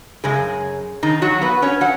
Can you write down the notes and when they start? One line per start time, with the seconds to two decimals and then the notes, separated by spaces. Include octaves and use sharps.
0.24 F#2 C#3 G#3 G#4
1.03 D#3 D#4
1.22 F#3 F#4
1.42 B3 B4
1.62 C#4 C#5
1.81 F#3 F#5